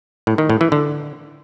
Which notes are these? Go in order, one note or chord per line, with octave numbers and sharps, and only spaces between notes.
A2
D#3
A2
E3
D3